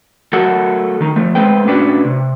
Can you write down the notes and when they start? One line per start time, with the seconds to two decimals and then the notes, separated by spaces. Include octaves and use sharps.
0.33 F#3 A3 F#4 A4 A#4 F#5
1.01 D#3 D#4
1.16 F3 A3
1.35 G#3 A3 C4 B4 G5
1.67 A2 C#4 D4 F#4 B4 D5
2.05 C3